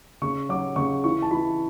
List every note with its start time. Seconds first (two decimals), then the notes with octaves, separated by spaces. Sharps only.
0.22 C#3 C#6
0.49 F#3 D6
0.76 C#3 C#6
1.04 E3 C#6
1.22 A5
1.31 E3 B5